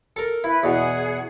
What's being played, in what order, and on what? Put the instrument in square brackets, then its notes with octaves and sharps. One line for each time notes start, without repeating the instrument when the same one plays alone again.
[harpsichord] A4 A#4
[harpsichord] E4 [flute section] B4
[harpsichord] E2 B2 [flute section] G#4 F#5